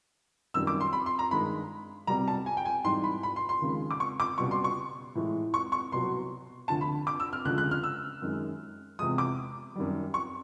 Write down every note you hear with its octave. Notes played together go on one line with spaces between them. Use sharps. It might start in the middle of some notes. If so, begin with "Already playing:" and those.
F#2 D#3 G3 E6
D6
C6
B5
C6
A#5
G2 D#3 G#3 B5
C2 B2 G3 A#5
A5
G#5
G5
G#5
G#2 E3 G3 C6
B5
B5
C6
C6
D#2 C#3 F3 G#3
D6
C#6
D6
C#2 B2 G3 C#6
C6
C#6
A2 E3 G#3
C#6
C#6
C2 B2 F#3 C6
D2 D3 F3 A5
B5
D6
E6
F6
D2 C#3 F3 G#3 F#6
F#6
F6
E6
F#2 D#3 G#3
E2 C3 F3 G#3 D#6
D6
F#2 D#3 G3
C#6